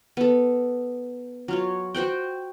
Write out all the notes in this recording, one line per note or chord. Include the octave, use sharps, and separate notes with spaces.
B3 A4
F#3 F4 C#5
F#4 C5 F#5 G5